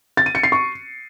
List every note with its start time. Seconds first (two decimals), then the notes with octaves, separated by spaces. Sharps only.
0.17 A6
0.26 D#7
0.35 C#7
0.43 C7
0.52 C#6